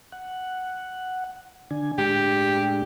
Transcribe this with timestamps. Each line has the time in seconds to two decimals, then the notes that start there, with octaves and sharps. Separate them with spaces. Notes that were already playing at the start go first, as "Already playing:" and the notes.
0.12 F#5
1.71 D3 D4 G#5
1.98 A2 G#3 D4 G4